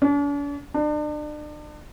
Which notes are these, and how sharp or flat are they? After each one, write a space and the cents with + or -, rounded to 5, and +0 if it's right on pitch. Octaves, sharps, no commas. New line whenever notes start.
D4 -45
D4 +35